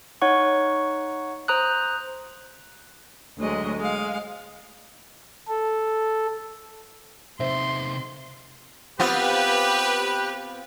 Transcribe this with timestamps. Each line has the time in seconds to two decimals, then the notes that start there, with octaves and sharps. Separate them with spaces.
0.22 D#4 C#5 F#5 C#6
1.48 C5 A#5 D#6 F#6
3.38 D2 F#3 G#3 D#5
3.77 G#3 F5
5.48 A4
7.40 C3 D#4 C5 E5 C6
9.00 B3 C4 F4 G4 B4